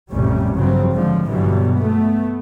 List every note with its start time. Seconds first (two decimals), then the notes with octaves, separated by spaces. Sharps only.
0.11 A1 F2 A2 C3 G3 C#4
0.54 G2 C#3 F3 F#3 C4
0.91 G#2 D3 F3
1.29 G2 B2 D3 E3 F#3 G3
1.74 A3 B3